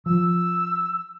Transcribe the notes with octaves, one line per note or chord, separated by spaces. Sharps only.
F3 E6